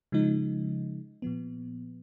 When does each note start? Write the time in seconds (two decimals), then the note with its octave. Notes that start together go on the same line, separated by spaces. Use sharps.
0.12 C#3 F3 G#3 D#4
1.22 A#2 F3 B3